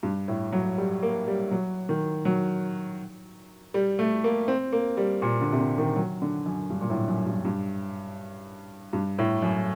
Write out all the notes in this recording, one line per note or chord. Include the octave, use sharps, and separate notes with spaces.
G2
A2
F#3
G3
A#3
G3
F#3
D#3
F#3
G3
A3
A#3
C4
A#3
G3
A#2
D3
C3
D3
D#3
F#3
D3
F#2
G2
A#2
A2
F#2
G2
G2
G2
A2
F#2